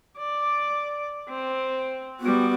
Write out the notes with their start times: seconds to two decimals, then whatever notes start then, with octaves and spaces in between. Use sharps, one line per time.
0.18 D5
1.29 C4
2.20 G3 B3 F#4